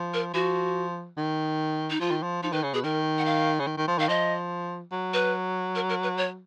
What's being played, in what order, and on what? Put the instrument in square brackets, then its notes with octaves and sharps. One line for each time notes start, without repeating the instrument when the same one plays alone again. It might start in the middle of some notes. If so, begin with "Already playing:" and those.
Already playing: [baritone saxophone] F3
[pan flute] A#4
[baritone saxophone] F3 [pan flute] F#4
[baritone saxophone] D#3
[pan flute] D#4
[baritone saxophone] F3 [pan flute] F4
[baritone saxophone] D#3
F3
[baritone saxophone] F3 [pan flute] D#4
[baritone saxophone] D#3 [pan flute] B4
[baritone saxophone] C#3
[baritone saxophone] B2 [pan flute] G#4
[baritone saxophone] D#3 [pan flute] A#4
[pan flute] F#5
F5
[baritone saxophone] C#3
D#3
D#3
F3
[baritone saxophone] D#3 [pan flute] F5
[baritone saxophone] F3 [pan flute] D#5
[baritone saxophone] F#3
[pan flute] B4
A#4
A#4
B4
C#5